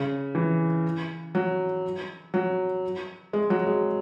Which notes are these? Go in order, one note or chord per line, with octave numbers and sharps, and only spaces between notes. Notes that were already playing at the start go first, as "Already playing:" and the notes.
Already playing: C#3
E3
F#3
F#3
G#3
F#3
G#3